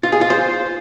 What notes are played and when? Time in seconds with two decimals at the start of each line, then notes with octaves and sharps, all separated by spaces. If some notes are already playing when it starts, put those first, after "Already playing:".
0.03 F4
0.12 G#4
0.21 F4
0.30 C5